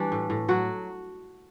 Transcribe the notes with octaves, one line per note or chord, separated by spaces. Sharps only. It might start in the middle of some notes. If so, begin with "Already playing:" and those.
Already playing: E3 G3 D4 F#4
A2
A2
F#3 F#4